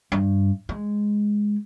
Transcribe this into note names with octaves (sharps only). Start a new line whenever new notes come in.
G2
G#3